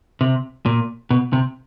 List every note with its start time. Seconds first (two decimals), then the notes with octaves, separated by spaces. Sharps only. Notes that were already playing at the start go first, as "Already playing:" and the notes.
0.21 C3
0.66 A#2
1.10 B2
1.33 C3